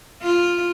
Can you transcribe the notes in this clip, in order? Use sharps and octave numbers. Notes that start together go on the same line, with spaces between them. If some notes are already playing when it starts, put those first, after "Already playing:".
F4